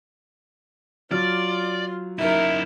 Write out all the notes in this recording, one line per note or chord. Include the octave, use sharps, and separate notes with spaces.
F#3 F4 D5 F6
F#2 D#4 E4 A#4 E5